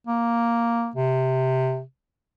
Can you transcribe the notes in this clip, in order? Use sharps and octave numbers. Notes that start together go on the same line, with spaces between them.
A#3
C3